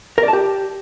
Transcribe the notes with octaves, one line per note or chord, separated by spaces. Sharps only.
A#4
D5
A5
G4